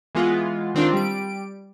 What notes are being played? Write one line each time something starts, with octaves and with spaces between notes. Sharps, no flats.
E3 G#3 B3 F4
D#3 C4 D4 F4
G3 D7